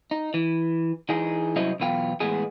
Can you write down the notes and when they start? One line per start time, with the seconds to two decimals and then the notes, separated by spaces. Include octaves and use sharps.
0.11 D#4
0.34 E3
1.09 E3 D#4 G#4
1.56 C2 F#3 C#4 E4 C5 D#5
1.80 B1 E2 B3 F4 G5
2.20 A2 E3 G#3 B3 G#4